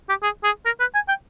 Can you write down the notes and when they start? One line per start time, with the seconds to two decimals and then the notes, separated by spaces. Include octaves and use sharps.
0.09 G4
0.23 G#4
0.44 G#4
0.65 A#4
0.80 B4
0.94 G#5
1.09 G5